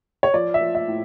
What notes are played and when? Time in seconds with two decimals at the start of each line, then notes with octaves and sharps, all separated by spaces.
0.23 C#5
0.34 F3 D5
0.54 E5
0.61 F3
0.75 E5
0.88 A2